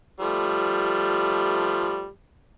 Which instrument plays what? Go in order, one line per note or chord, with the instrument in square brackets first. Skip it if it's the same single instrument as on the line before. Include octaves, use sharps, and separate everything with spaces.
[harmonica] F3 G3 A3